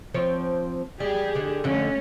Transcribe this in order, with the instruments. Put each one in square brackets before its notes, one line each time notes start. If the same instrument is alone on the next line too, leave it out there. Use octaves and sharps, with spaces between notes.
[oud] F3 C4 C#5
[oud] G3 [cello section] G4 G#4
[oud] D3 D4
[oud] F2 D3 [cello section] A3 C#4